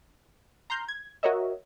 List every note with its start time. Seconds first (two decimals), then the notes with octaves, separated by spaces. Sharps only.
0.70 A#5 C6 F6 G6
0.88 G#6
1.23 F#4 A#4 C#5 D#5 E5